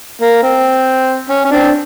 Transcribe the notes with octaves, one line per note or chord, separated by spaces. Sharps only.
A#3
C4
C#4
C#4
C4 D4